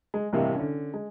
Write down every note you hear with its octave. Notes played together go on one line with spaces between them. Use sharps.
G#3
A1 G2 C3 A#3 D#5 F5
D3 C#4
G#3